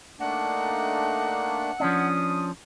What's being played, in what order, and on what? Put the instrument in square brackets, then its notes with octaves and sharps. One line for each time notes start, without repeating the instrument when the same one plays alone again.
[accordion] A3 A#3 D4 [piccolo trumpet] D#4 [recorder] F#5
[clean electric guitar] F3 C#4 D4 [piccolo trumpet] D#6